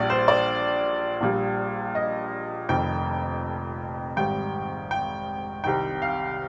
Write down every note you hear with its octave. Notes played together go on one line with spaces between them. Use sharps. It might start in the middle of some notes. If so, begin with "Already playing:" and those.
Already playing: A#1 A#2 G3 D5
C5
D5
A#1 A#2 G3
D#5
F1 F2 D#3 G5
G#1 G#2 G3 G5
G5
C2 C3 D#3 G5
F5